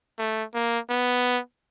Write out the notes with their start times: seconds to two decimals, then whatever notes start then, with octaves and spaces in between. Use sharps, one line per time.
0.19 A3
0.54 A#3
0.90 B3